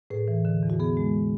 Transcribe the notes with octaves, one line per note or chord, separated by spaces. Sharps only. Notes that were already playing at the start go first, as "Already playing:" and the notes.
A2 G#4 B4
E3
D3
E2
F#4
B3 G#4
G#3